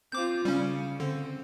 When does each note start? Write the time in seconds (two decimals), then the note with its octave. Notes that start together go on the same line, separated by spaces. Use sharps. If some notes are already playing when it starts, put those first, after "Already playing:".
0.12 C4 F4 D6 G6
0.45 C#3 G3 C#4
1.00 D3 C4